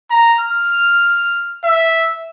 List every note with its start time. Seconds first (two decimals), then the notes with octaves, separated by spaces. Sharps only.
0.10 A#5
0.40 F6
1.64 E5